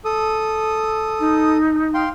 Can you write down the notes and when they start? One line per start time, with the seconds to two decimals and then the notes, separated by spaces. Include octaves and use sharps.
0.05 A4 D#6
1.19 D#4
1.94 F5 G5 C6